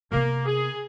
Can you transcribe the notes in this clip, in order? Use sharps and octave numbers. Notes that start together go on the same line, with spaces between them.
C3 A#3 B3
G#4